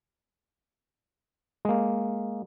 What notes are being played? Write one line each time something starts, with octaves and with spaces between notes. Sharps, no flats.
G#3 A#3